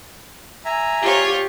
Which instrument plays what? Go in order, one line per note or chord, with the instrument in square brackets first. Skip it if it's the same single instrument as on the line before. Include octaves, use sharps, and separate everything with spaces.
[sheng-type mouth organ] E5 G#5 A#5
[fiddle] F4 C#5 [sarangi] G4